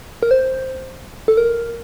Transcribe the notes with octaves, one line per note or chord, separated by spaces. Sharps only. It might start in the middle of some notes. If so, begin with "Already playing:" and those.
A#4
C5
A4
A#4